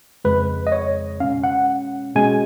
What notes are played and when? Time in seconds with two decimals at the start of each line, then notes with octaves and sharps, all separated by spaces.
0.25 F2 C#3 G#3 B4
0.67 D#5
0.72 C#5
1.20 B2 G#3 C#4 F5
1.44 F#5
2.16 B2 G#3 C#4 G#5